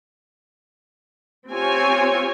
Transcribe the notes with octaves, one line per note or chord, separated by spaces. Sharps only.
C4 F4 G4 C#5 G#5